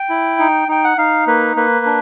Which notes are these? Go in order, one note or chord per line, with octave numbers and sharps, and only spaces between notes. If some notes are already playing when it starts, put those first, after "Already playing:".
Already playing: G5
E4
D#4
D#4 G5
F#5
D#4 F5
A#3 B4
A#3 B4
D4